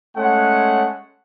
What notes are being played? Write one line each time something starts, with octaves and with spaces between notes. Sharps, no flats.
G#3 A3 C#4 F#5